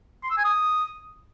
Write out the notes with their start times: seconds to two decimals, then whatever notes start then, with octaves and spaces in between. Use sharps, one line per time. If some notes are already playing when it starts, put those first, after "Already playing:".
0.23 C6
0.30 E6
0.37 G#5
0.44 D#6